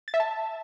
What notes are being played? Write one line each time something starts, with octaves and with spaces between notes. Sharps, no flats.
A6
E5
A5